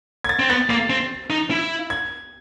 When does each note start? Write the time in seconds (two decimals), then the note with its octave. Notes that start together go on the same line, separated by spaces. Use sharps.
0.24 G#6
0.29 A6
0.39 C4
0.49 B3 A6
0.70 A#3 A6
0.90 C4
1.30 D#4
1.51 E4
1.90 G#6